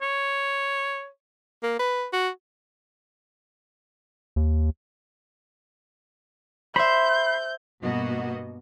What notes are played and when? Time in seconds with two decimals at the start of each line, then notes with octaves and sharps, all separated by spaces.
0.02 C#5
1.63 A#3
1.79 B4
2.13 F#4
4.36 D#2
6.76 C5 E5 B5 C6 G6
7.81 G2 B2 A#3 B3 F#4 D#5